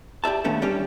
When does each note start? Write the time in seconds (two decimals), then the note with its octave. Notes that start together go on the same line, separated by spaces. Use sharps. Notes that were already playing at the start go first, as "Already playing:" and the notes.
0.24 G4 D5 E5 A5
0.44 A#2 D#3 A3 B3 C#4 D4
0.62 A2 G3 C#4 D4 G4 A4